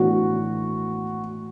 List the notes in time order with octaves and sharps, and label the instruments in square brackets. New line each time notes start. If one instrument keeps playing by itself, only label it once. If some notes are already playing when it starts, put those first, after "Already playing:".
Already playing: [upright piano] A2 E3 B3 D4 [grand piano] F#4